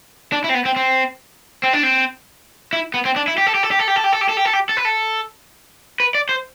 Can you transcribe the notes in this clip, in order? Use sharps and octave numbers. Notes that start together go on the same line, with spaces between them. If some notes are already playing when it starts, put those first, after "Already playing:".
D4
E4
C4
B3
C4
C4
C4
D4
C4
E4
B3
C4
D4
E4
G4
A4
G4
A4
G4
A4
G4
A4
G4
A4
G4
A4
G4
A4
G4
A4
B4
A4
B4
D5
C5